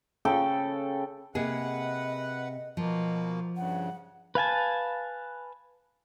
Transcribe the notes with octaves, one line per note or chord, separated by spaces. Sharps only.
C#3 A4 G5
C3 A#3 G#4 B4 D#5 F#5
B2 F3 A#3
G2 C#3 F#5
B4 F5 G#5 A5